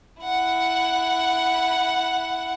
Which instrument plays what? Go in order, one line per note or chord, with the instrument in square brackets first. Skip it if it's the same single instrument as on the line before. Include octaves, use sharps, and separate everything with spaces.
[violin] E4 F#5